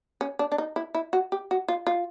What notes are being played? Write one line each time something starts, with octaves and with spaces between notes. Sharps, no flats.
C#4
D4
D4
D#4
E4
E4
F#4
G4
F#4
F4
F4